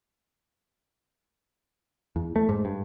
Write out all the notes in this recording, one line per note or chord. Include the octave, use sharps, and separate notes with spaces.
E2
A3
G#2
G2